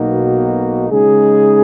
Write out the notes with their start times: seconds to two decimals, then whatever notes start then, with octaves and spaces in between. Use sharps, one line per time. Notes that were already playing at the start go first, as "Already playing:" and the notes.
Already playing: B1 B2 A#3 D#4 F#4
0.90 C#3 G#3 D#4 G#4